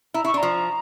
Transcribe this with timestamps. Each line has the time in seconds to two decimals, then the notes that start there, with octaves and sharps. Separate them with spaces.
0.14 E4 A#5
0.25 E4 C#6
0.34 D4
0.37 A#5
0.43 F3